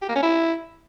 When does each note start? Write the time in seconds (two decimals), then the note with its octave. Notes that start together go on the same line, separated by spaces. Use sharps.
0.02 G4
0.09 A#3
0.16 C#4
0.23 E4